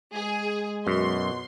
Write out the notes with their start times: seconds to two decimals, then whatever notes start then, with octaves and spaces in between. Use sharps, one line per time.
0.14 G#3 G#4
0.87 F#2 B2 C6